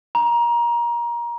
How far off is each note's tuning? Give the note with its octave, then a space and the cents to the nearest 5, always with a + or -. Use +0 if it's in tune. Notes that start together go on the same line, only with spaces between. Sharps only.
A#5 +25